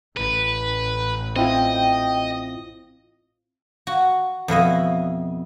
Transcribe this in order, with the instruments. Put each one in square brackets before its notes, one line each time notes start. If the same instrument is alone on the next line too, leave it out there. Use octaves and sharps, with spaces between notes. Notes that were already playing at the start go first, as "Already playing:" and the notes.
[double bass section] A1 [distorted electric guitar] B4
[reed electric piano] C4 E4 F4 [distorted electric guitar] D#5 [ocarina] G5
[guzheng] F#4
F2 B2 E4 D#5